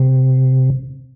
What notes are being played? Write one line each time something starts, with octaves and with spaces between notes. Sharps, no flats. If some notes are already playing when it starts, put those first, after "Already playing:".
Already playing: C3